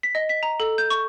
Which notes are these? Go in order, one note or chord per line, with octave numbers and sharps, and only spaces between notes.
B6
D#5
B6
A#5
A4
G6
C#6